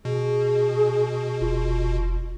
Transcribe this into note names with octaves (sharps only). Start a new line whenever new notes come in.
B2 G#4
F1 F4